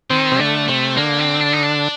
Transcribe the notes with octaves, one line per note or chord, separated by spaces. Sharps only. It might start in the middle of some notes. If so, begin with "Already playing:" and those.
D#3 C4
C3
D3 A3
C3 A3
D3 A#3
C4
D4
D#4
D4